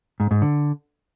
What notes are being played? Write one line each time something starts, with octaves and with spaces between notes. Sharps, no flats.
G#2
G#2
D3